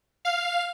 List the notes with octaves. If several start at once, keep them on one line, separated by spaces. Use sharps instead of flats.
F5